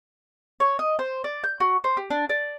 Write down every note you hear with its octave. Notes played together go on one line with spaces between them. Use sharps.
C#5
D#5
C5
D5
G6
F#4
C5
G4
D4
D5